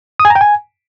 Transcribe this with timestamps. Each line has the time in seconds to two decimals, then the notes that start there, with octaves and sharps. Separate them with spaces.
0.20 D#6
0.25 G#5
0.30 A#5
0.36 G5
0.41 G#5